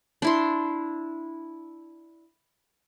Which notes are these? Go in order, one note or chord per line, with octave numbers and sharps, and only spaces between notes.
D4 E4 C6